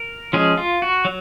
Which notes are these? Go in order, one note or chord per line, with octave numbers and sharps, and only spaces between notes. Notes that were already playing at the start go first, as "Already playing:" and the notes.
Already playing: A#4
F3 G#3 C#4 G#4
F4
F#4
F#3